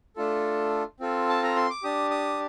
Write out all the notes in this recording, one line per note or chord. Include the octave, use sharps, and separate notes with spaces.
A3 D4 F4 A4
C4 F4 A4
A5
A#5
C6
D6
D4 G4 D#6
D#6